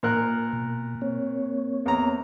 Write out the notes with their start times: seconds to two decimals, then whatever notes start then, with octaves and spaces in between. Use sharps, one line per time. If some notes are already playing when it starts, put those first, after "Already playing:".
0.03 A#2 A#4 F#6
0.53 B2
1.02 A#3 C4 C#5
1.86 E2 A#5